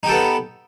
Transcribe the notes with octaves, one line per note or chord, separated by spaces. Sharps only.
B3 D#4 G4 A4